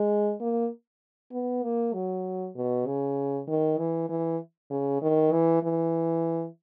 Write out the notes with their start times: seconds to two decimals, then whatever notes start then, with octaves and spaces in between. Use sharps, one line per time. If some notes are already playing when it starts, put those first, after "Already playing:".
Already playing: G#3
0.41 A#3
1.32 B3
1.63 A#3
1.93 F#3
2.56 B2
2.86 C#3
3.47 D#3
3.78 E3
4.09 E3
4.71 C#3
5.02 D#3
5.32 E3
5.63 E3